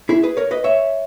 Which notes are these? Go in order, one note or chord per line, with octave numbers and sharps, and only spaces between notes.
E4 G#4
G#4 B4
A#4 C#5
B4 D#5
C#5 E5